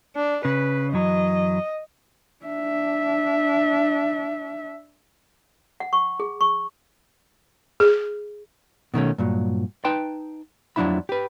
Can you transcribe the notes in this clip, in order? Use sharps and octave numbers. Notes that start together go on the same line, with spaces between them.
D4
C#3 B4
F#2 E3 F#3 D#5
D4 E5
F#5
C#6
G#4
C#6
G#4
B2 D#3 A3 C#4
G2 A#2 F#3
D#4 B4 G5 A5 C6
F2 F3 F#3 D4 E4 B5
G4 B4